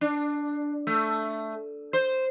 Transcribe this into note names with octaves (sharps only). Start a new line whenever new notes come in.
D4
A3
C5